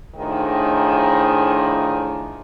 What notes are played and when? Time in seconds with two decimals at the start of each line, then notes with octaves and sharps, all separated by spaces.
0.16 A2 D#3 F3 D4 D#4 G#4